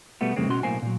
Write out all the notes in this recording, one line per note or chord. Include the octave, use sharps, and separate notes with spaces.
B2 G3 A3 B3
F2 A2 C#3 G#3 A#3 C4
B2 C#4 F#4 C6
B1 A2 A#3 C5 G#5
A#2 F#3